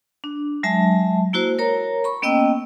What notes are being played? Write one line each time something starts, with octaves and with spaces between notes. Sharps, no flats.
D4
F#3 G#3 E5 A5
A#3 E4 F#4 C5
A#4 C#5 A#5
B5 C#6
A#3 B3 C#4 D#5 G5 E6